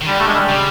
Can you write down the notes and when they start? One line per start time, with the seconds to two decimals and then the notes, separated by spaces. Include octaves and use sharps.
0.02 D#3
0.07 D3 G3
0.20 A3
0.27 G#3
0.35 G3
0.49 C#3